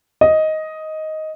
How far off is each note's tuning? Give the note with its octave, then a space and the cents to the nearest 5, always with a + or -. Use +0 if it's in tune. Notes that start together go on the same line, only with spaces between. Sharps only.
D#5 +10